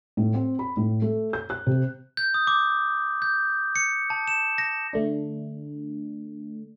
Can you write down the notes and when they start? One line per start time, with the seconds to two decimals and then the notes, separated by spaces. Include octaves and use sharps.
0.17 A2
0.34 C4
0.59 B5
0.77 A2
1.02 A3
1.33 G6
1.50 F#6
1.67 C3
2.17 G6
2.34 D#6
2.47 D6
3.22 G6
3.76 C#7
4.10 A5
4.27 E7
4.58 A#6
4.93 D3 A3 D4